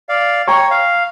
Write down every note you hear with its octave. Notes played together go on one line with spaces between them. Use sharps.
D5 F5
C#5 G5 A#5 C#6
F5